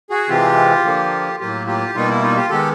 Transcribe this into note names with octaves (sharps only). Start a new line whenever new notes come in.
F#4 G#4
C3 E3 G#3 C4 F4 G4
D3 F3 A#3
A2 F#3 A#3 F4 G4
F4 G4
B2 G3 A#3 D#4 F4
E4
D#4 F4
F4 G4
D#3 G#3 B3 G4 A4